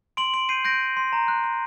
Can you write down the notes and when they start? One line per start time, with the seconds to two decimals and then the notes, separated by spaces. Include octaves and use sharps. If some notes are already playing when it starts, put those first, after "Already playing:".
0.17 C6 D7 F#7
0.34 C6 D7 F#7
0.49 G6 C7 D#7
0.65 G6 A#6 D7
0.80 G6
0.97 C6
1.13 A#5
1.28 F#6
1.44 F#6